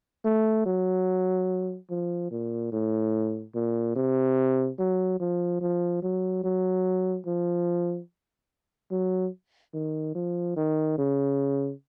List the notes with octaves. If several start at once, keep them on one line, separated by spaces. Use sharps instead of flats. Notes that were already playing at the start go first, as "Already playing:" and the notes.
A3
F#3
F3
A#2
A2
A#2
C3
F#3
F3
F3
F#3
F#3
F3
F#3
D#3
F3
D#3
C#3